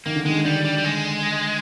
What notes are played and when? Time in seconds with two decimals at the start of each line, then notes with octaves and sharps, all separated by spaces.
0.06 D#3 A#3
0.16 D3
0.25 D#3 G#3
0.45 D3 G3
0.64 G3
0.78 G3
0.84 G#3